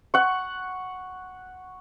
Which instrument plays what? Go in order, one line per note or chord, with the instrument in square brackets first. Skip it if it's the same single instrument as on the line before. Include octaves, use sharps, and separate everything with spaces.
[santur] F#5 C#6